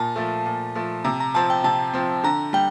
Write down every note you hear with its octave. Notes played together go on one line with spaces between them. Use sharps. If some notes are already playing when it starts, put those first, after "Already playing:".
Already playing: A#2 A5
F3 A3
A#2
F3 A3
C3 A#5
A#5
F3 C4 A5
G5
C3 A5
F3 C4
D3 A#5
G3 G5